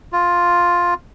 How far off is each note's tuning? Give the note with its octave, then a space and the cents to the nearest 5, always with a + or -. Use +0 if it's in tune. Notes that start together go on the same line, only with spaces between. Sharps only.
F4 +5